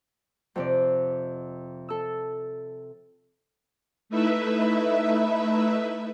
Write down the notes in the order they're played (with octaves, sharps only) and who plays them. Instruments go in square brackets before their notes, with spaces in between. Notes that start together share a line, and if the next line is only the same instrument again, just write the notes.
[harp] F2 C3 D5
A4 E6
[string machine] A3 D#4 E4 B4 E5